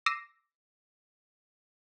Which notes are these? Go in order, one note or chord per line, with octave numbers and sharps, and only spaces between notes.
D6 E6 A#6 C7 D#7 E7